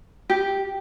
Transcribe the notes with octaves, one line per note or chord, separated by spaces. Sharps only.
G4